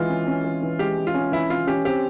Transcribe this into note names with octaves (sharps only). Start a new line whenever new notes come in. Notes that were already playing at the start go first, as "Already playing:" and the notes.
Already playing: E3 G#3 F4
C#4
C#4
E3
E3
G#3 G4
G#3
F4
C#4
E3 E4
C#4 F4
C#4 G4
C4 G4